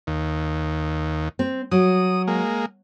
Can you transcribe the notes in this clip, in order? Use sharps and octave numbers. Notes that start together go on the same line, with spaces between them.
D#2
C4
F#3 D#6
G#3 A#3